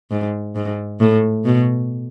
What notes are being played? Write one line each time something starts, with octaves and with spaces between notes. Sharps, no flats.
G#2
G#2
A2
B2